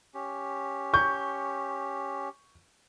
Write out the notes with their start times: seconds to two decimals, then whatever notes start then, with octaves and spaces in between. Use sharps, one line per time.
0.14 C#4 G4
0.94 C#6 G6